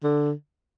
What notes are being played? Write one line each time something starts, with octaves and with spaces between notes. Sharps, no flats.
D3